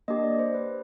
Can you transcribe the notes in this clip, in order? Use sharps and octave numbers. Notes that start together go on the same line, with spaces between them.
A#3 D4 G4 D#5
D5
C5
B4